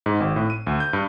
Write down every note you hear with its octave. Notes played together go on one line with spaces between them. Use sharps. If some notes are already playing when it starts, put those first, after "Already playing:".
G#2
G#1
A2
D#7
D2
G6
G2